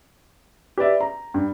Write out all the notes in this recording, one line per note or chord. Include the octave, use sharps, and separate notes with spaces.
G4 B4 D5 E5
A#5
G2